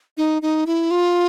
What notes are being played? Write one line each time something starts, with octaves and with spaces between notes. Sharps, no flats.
D#4
D#4
E4
F4